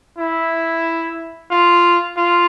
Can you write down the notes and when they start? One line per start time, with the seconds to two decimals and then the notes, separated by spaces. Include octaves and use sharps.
0.18 E4
1.51 F4
2.17 F4